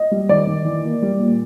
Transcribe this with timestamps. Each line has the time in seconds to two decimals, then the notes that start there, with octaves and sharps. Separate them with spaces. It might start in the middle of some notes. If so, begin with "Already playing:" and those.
Already playing: D#5
0.11 G3
0.29 D#3 D5
0.47 D#3
0.65 E3
0.84 A#3
1.02 G3
1.20 A#2